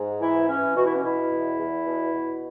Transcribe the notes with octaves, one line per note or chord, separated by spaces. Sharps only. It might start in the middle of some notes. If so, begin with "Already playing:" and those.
Already playing: G#2
E3 E4
E3 C#4
B2 F#4
E4
C#4
B2 E4
E2
E2
B2
B2